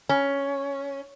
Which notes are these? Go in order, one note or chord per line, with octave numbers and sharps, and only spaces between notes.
C#4